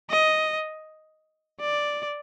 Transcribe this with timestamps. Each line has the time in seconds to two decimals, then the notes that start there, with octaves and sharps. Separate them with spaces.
0.11 D#5
1.60 D5